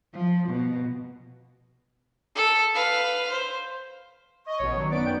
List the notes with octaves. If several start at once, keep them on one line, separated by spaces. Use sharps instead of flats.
F3
B2
A4
B4 F5
C5
D#5 C#6
A1 B2 C#5
D3 D#3 F#3
F#2 B3 D#4 D5 D7
G5